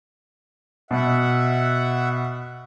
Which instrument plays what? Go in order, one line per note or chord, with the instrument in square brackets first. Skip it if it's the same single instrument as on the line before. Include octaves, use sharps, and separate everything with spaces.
[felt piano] B2 [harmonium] E5 F#5